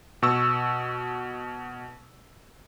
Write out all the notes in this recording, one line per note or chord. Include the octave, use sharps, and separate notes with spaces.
B2 C#6 E6